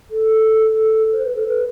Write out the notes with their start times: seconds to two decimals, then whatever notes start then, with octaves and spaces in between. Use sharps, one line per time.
0.10 A4
1.12 C5
1.23 B4
1.35 A4
1.46 B4